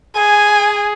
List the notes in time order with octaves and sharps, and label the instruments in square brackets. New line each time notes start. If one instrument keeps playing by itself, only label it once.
[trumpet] G#4 [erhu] G#5